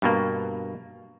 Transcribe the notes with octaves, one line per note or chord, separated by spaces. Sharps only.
G2 B2 A#3